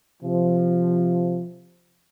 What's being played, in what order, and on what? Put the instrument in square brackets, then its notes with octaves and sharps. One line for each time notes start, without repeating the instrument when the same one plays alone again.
[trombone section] C3 F3